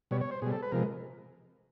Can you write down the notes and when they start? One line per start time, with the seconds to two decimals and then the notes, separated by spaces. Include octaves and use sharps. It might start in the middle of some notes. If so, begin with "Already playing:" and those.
0.11 B2 G3 C#5
0.21 C#5
0.31 C5
0.42 B2 G#4
0.46 G3
0.52 A4
0.62 B4
0.72 C3 F3 G#3 A#4